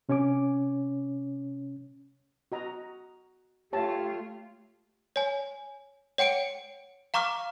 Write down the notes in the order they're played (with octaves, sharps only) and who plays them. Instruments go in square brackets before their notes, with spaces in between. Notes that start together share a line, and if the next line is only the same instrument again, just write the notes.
[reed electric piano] C3 C#4 C#5 G#5 D6
[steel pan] F#4 D#5 A#5
[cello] A3 F4 [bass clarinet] G4 [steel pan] C#5 A5
[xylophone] C#5 G#5
C#5 F#5 G5 C#7 D7
F5 A#5 C#6 D6 F6